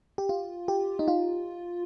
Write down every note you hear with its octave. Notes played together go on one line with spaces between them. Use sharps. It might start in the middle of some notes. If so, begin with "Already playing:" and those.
G4
F4
G4
D#4
F4